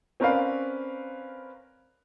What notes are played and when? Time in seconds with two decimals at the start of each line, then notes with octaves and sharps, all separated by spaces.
0.20 C4 C#4 A#4 B4 D5 F5